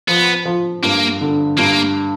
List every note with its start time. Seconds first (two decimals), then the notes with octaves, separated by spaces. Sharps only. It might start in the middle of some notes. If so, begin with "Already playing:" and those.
0.08 F3 B3
0.45 F3
0.83 G2 A#3
1.21 D3
1.58 G2 A#3